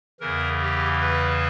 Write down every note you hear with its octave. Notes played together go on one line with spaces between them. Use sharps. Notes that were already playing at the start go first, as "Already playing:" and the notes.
E2 C#3 E3 A#4
G4
B4